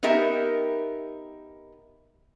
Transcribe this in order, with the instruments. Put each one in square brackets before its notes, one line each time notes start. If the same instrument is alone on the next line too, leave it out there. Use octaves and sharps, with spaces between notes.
[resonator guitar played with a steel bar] B3 D#4 G4 A#4 E5